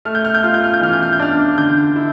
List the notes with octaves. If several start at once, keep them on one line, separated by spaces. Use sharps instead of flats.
A3 F6
G6
F6
G6
F4 F6
G6
F6
G6
E3 F6
G6
F6
G6
D4 F6
D3 G6
E4